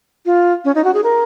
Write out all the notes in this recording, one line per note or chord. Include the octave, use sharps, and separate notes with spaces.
F4
C#4
D#4
F#4
G#4
A#4